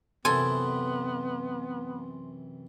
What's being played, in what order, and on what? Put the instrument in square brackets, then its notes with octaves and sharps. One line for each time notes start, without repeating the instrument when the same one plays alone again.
[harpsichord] F#2 C3 E3 [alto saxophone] B3 [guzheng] A4 G#5 [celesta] C6